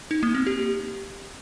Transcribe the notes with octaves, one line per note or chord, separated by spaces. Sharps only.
D#4
A#3
C4
G4